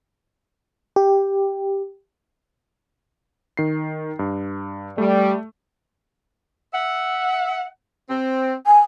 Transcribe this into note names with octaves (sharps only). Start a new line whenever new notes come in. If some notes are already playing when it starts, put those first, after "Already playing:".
G4
D#3 C7
G2
G3 A3
E5 F#5
C4
G#5